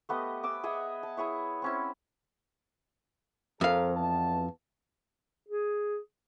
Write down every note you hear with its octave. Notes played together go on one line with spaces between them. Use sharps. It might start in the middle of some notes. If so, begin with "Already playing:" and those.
A3 B3 G4 D#5
G#5 D6 E6
G#4 D#5 E5 F#5
A5
E4 G#4 C#5 E5
C4 C#4 E4
F2 A4 A#4 C5 F5
E2 B3 A5
G#4